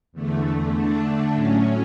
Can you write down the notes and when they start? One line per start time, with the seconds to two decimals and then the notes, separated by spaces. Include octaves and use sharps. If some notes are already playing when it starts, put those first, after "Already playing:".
0.13 E2 D3 A3
0.74 D3 A3 D4
1.34 A2 F#3 C#4